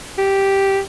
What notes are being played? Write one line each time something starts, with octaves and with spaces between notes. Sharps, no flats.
G4